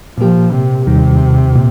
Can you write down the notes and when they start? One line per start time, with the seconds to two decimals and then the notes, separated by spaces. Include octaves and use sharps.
0.18 A#2 F3 A#3 G4
0.52 C3
0.86 D#2 C3 D#3 G3
1.56 A#2